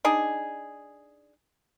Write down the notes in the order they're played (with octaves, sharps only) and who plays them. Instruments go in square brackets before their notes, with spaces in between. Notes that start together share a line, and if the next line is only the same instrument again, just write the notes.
[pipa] D4 D#4 G#4